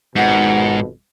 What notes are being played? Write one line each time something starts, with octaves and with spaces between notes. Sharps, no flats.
G#1 F2 G#2 B2 F#5